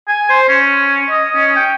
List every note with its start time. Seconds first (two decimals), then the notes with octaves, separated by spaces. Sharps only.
0.08 G#5
0.30 C5
0.48 C#4
1.10 D#5
1.35 C#4
1.56 G5